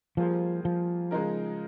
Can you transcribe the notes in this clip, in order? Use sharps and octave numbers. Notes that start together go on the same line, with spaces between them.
F3 G3 A#3 F4 G#4 C5
F3
C#3 G#3 D#4 A#4